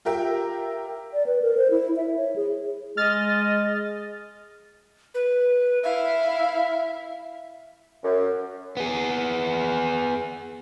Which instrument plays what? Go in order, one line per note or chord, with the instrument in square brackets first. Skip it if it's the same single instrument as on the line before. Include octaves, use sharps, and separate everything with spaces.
[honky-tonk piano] F4 G4 A#4 E5 G5
[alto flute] D5
B4
A#4
C5
E4
E5
C#5
G#4
[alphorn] G#3 [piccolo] D#5 [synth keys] F6 A6
[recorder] B4
[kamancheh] E4 F5 [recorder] E5
[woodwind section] F#2
[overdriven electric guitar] B3 G#4